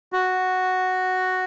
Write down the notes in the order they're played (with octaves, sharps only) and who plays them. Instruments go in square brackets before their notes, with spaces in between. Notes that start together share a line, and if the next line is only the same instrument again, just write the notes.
[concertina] F#4